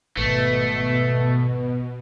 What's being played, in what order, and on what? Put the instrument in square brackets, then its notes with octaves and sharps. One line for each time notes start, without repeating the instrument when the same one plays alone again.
[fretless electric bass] G#1 [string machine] B2 [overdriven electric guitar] A3 [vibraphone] B4